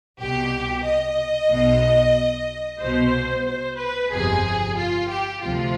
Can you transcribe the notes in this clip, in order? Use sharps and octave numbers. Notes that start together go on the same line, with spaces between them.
C2 B2 G4
D#5
B1 B2
C2 B2 C5
C5
B4
G1 F2 C3 G#4
F4
G4
D2 C3 F3 F4